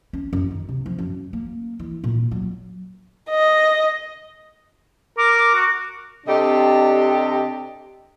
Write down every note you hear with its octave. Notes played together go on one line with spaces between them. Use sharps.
C#4
F#2
D#3
C3
F3
F#2
A#3
E3
A#2
F#3
D#5
A#4 D6
F#4
C3 D4 G4 A4 D#5